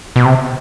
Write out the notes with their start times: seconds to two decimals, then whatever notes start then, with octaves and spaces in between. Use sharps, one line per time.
0.16 B2
0.25 C3